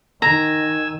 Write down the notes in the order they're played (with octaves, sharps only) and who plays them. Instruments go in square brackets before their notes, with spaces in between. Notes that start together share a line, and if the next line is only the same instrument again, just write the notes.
[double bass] D#3 [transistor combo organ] G#5 E6 [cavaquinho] A#5